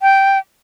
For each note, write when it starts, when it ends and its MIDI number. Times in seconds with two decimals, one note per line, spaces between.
0.01 0.38 79